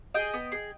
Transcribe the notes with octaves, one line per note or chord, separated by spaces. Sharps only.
G#4 D#5 G5
B3
G#4